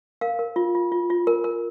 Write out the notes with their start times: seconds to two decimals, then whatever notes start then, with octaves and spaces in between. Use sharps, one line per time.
0.21 A#4 F5
0.39 A#4
0.56 F4
0.75 F4
0.92 F4
1.10 F4
1.27 A#4
1.44 A#4